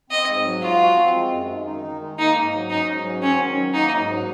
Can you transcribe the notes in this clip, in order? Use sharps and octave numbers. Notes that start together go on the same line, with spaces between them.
C4 D#5
G#2
F#3
F4 F#4
F3
C4
G#3
F#2
D#3
D#4
D#3
G#3
A#3 D#4
G#2
F#3
C#4 D#4
G#2
F#3
C4 C#4
D#3
F#3
A#3 D#4
G#2
F#3